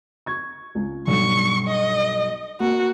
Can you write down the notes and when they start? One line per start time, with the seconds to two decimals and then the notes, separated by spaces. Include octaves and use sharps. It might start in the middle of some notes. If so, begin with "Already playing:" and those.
0.26 C#6 G#6
0.75 C#2
1.07 B1 G2 C#6
1.68 D#5
2.60 A#3 F#4